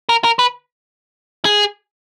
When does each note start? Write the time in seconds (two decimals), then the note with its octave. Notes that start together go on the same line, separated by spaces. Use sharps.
0.09 A#4
0.24 A#4
0.39 B4
1.45 G#4